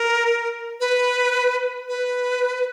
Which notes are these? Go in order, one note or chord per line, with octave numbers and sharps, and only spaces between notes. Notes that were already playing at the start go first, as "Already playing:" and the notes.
Already playing: A#4
B4
B4